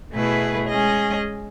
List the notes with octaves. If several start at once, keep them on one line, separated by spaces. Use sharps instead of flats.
B2 A3 E4 G#4 B4
G#3 C#4 G#4 D#5